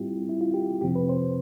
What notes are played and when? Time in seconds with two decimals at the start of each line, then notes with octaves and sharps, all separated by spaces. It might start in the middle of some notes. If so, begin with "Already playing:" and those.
Already playing: A2 G3 C4 E4 F4 G4
0.29 E4
0.41 F4
0.54 G4
0.81 F2 C3 F3 C4 G4
0.95 B4
1.09 C5